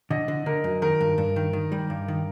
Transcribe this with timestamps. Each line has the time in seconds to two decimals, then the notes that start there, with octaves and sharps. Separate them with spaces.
0.11 D3 D#5
0.28 D3
0.46 D3 A#4
0.64 F#2
0.82 D#3 A#4
1.01 G2
1.18 G2
1.36 D#3
1.53 D#3
1.72 G3
1.90 G2
2.08 D#3